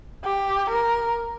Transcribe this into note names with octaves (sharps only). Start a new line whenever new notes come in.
G4
A#4